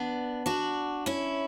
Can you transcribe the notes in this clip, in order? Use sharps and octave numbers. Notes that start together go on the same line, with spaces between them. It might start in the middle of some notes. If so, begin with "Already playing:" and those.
Already playing: B3 D4
D4 F#4
C#4 E4